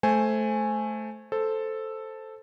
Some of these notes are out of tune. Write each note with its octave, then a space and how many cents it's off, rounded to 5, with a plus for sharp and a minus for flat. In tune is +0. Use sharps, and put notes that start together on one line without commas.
A3 -10 C5 +0 G#5 +0
A4 +0 C5 +0